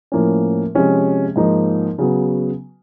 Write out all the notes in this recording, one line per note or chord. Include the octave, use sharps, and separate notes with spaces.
A2 F3 A#3 C#4
C3 F3 G#3 C#4
G#2 F3 A#3 D#4
C#3 F#3 B3